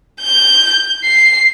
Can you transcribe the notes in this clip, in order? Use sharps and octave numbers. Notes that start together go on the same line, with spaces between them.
G6
C7